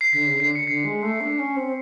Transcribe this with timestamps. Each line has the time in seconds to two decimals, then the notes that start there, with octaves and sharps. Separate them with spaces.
0.01 C7
0.12 D3 B6
0.27 C#3
0.39 D3 C7
0.55 C#7
0.66 D3 C7
0.84 G#3
1.03 A3
1.21 D4 C#7
1.39 C#4
1.57 C4